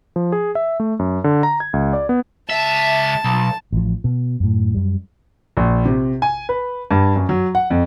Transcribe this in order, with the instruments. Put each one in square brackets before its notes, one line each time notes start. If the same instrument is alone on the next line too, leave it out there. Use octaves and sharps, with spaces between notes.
[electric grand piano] F3
G#4
E5
A3
F#2
D3
A#5
G#6
C#2
D5
B3
[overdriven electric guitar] C#2 E5 [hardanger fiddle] A5
[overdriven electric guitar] B1
[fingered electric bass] A1 F3
B2
F#2 A2
F#2 G3
[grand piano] A#1
C3
G#5
B4
G2
F#2
F#3
F#5
F2